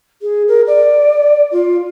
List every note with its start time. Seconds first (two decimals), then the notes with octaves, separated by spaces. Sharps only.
0.22 G#4
0.48 A#4
0.67 D5
1.51 F4